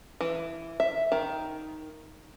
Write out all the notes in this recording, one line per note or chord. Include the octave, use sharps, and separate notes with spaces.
E3
E5
D#3